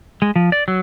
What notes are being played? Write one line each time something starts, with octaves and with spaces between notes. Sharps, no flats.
G#3
F3
D5
F#3